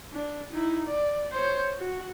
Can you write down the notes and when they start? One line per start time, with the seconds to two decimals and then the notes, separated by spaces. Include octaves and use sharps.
0.12 D4
0.52 D#4 E4
0.88 D5
1.32 C5 C#5
1.79 F#4